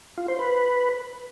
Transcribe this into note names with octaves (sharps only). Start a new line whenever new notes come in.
F4
C5
B4